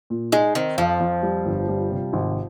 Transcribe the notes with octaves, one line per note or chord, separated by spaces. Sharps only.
A#2
G#3 D#4
D#3 C4
F2 F3
F2
G3
G1
G3
C3
G#1